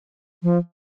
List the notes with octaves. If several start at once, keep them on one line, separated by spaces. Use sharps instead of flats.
F3